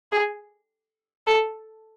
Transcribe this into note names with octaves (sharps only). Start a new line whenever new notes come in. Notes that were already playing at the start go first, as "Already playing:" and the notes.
G#4
A4